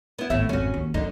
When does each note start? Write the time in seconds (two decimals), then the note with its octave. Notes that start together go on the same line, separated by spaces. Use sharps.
0.19 B3 E4
0.30 G#1 A2 A3 B3 E5
0.49 G#1 F2 C#4 F#4
0.74 D#2
0.94 F#2 D3 D#4